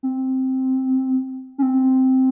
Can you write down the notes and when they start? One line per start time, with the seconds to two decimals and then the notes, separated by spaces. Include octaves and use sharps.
0.03 C4
1.58 C#4
1.62 C4